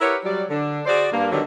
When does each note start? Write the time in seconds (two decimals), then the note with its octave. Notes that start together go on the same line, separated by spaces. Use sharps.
0.01 E4 G4 A#4 B4 C#5 F#5
0.25 F#3 G3 D5
0.50 D3 D4
0.86 F#4 G#4 C5 D5
1.12 G2 A#3
1.32 D3 D#3 F#3 G3 B3